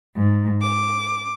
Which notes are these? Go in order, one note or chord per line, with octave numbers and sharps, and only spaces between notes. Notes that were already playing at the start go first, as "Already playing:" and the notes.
G#2
D6